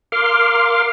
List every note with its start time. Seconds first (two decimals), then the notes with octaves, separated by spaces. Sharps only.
0.12 A#4 F5 C6 D6 F6